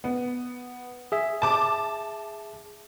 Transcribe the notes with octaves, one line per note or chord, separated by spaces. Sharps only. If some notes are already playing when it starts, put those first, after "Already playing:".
B3
G#4 E5
A5 D6